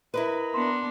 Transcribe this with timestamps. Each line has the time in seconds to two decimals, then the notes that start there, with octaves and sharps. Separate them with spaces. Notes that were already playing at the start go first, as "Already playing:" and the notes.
0.14 E4 A#4 B4 D#5 A#5 B5
0.54 B3 D4 C6